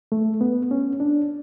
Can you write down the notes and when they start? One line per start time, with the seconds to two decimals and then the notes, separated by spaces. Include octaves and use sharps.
0.12 A3
0.41 B3
0.71 C#4
1.00 D4